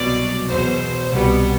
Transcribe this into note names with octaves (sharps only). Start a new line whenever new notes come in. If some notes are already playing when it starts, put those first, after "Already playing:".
Already playing: C2 B2 F#3 D5
E2 B2 F#3 C5
C2 B2 G3 B3